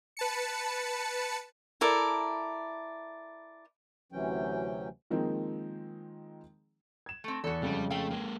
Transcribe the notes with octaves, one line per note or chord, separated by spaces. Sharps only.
B4 A5 C#7
E4 A4 A#4 D5
D2 C3 E3 F#3 C#4 G5
D#3 F3 G#3 A#3 C4 D#4
G#6 E7
A3 C4
E2 F#4 A4
F2 C#3 G3 G#3
A3 F5 G5
G#3 A#3